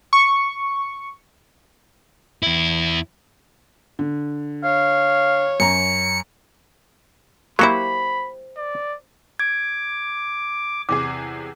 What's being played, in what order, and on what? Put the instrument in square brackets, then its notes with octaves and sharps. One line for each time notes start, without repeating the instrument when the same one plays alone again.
[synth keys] C#6
[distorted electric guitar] E2 E4
[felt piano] D3
[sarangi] C#5 [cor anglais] F5
[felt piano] F#2 A#5 [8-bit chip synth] C#7
[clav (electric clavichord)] F#3 F#4 [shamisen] A#3 E4 [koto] G4 C5 [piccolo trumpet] B5
[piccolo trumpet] D5
[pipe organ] D6 [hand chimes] G#6
[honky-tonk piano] E2 C3 G#4 [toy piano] D6